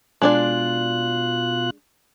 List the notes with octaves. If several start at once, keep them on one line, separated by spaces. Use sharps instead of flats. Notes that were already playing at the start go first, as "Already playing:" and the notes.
B2 G#3 D4 F4 D5 F#6